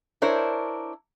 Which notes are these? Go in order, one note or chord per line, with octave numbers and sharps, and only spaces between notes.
D4 E4 A#4 C5 C#5